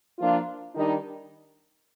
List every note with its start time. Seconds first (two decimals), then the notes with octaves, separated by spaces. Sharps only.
0.19 F3 A#3 D4 F4
0.75 D#3 G3 D4 D#4